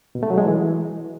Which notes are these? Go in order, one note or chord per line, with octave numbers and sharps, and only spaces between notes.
B2
A3
F#3
G#3
E3